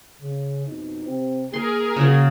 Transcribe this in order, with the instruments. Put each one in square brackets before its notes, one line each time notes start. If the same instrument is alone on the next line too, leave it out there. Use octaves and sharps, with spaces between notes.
[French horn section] C#3
F2 B2 D#4
C3 C4
[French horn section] A#3 [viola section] G#4 A#4 [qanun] C6
[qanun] C#3 F#3